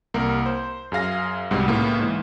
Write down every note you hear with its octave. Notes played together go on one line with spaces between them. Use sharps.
C2 A#3 A#4
C5
F#2 G#4 F5 A#6
C2 G#2 B2 G3
A2 C#3 A#3 B3
G#2 E3